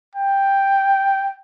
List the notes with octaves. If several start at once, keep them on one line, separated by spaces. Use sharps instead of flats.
G5